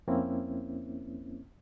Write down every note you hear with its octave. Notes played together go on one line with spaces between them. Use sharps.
F2 A#3 C4 C#4 E4